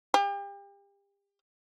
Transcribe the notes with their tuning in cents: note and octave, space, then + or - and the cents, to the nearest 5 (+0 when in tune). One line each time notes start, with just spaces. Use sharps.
G4 +35